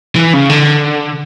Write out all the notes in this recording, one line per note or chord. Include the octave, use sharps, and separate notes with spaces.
E3
C#3
D3